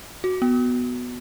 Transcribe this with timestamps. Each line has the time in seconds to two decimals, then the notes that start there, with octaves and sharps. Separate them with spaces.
0.24 F#4
0.42 B3